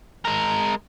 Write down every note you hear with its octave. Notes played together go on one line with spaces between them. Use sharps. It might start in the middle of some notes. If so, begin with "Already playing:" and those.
G#3 A#4